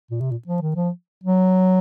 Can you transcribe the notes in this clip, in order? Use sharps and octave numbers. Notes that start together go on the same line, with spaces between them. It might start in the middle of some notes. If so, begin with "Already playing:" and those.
A#2
C3
A#2
F3
D#3
F3
F#3